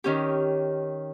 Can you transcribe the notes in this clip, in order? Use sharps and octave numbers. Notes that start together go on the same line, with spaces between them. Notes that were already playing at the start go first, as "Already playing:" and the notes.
D#3 C#4 G4